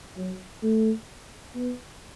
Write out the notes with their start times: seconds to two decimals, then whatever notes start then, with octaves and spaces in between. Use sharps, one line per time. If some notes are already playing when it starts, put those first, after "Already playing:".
0.17 F#3
0.63 A3
1.55 B3